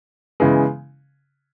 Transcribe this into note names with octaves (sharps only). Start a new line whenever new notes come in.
C#3 E3 G#3 B3